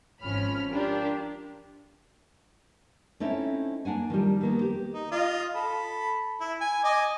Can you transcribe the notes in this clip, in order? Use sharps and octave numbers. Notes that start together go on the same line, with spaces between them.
G#1 F3 C#4 B5 F6
D4 F4 G4 A#4
A3 C4 C#4 D#4 E4
A#3 D4 F#5 G#5
D#3 F3 G3
D#3 A#3 B3
G4
D#4
F4 D#5
A4 B5
E4
G#5
D#5 G#5 D6